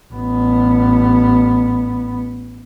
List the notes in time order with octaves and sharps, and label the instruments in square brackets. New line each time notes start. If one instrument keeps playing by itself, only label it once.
[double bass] A1 B3